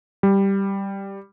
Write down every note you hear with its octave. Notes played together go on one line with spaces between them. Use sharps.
G3